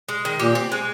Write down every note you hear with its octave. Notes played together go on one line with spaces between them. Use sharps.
G#3
D#3
A#2 G4
C4
G#3